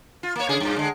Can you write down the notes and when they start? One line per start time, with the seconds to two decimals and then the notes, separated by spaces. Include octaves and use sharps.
0.23 F4
0.36 A#3 C#5
0.49 C#3 G#4
0.60 G2 A#2
0.76 D3 G#3